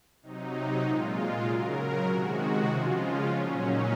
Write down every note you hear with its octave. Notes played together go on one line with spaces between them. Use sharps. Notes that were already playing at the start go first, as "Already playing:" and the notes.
C3 F#3 D#4
A#2 G#3 F4
C#3 F#3 A#4
C3 D#3 G#3 F#4
C#3 F3 G#3 F4
C#4
A#2 F#3 C#4
D#4